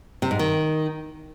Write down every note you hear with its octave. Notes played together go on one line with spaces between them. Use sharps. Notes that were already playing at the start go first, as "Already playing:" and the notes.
C3
G#2
D#3